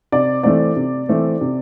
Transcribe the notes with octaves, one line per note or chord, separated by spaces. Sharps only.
C3 D5
E3 A3 C4 D5
C3
E3 A3 C4
C3